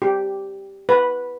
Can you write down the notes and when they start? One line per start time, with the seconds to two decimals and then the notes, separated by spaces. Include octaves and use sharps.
0.02 G4
0.89 B4